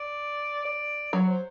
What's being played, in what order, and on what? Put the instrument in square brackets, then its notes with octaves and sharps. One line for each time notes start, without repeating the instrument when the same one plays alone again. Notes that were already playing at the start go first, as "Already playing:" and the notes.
Already playing: [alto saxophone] D5
D5
[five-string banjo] F#3 [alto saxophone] C#5
[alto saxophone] C5